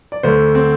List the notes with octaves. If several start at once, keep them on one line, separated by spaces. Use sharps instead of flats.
D5
D2 D3 C5
C4